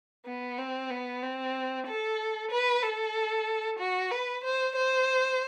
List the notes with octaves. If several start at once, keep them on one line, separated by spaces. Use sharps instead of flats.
B3
C4
B3
C4
A4
B4
A4
F#4
B4
C5
C5